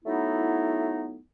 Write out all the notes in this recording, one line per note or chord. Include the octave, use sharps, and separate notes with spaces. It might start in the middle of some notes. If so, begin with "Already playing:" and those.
F#3 A3 B3 D#4 E4